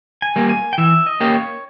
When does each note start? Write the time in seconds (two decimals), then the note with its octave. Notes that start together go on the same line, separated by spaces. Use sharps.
0.22 G#5
0.36 G3 A#3
0.49 G#5
0.73 G5
0.78 E3 E5
1.07 D#5
1.20 A#3 C#4 G4
1.34 C#5